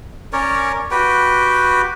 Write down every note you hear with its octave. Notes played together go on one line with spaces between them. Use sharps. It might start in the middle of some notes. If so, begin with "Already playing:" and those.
C#4 A#4 C#5 D5
F#4 G4 B4 G5